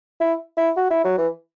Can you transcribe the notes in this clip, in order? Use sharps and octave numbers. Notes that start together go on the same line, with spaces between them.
E4
E4
F#4
E4
F#3
E3